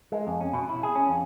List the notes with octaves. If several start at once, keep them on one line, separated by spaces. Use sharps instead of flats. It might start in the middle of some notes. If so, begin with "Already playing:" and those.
G#3
F2
C#4
B2
E4
G#4
C#4
F2